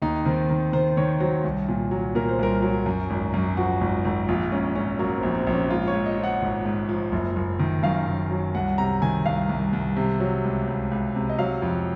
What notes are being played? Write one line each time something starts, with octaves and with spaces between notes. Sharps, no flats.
D#2 D#4
D#3 C4
D#3
D#3 C5
D#3 C#5
F#3 C5
C2
A#2
F#3
A#2 A#4
C5
C2 A#4
F#3
F#2
G#1
F#2
F3 F#4
G#1
G#1
A#1 F4
G#2 C#4
G#2 C#4
F#3 A#3
C4
A#1
C4
A#1
C#4
G#2 F4
C#5
G#2
D#5
F3
F#5
G#1
G#2
F3
F#1
F#1
D#3
F#2 F5
F#2
F#3
C2 F#5
C3 A#5
D#3 G#5
C2 F5
C2
C2
C3
F#3
C#2
C#2
C#2
C3
D#5
F#3 F5
F2